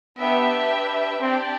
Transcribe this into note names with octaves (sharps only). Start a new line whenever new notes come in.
B3 D4 G4 B4 E5
C4 D4 G4 D5 G5